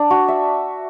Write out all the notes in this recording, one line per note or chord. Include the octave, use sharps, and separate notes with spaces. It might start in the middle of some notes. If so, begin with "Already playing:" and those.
Already playing: D4
F#4
E5